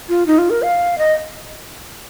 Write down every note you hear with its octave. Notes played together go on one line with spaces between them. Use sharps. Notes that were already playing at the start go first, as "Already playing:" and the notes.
F4
D#4
F4
A#4
F5
D#5